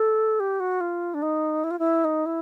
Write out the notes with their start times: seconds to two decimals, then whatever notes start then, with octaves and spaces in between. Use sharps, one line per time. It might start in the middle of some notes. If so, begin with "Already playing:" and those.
Already playing: A4
0.40 G4
0.60 F#4
0.81 F4
1.14 D4
1.22 D#4
1.64 E4
1.71 F4
1.79 E4
2.04 D#4
2.26 E4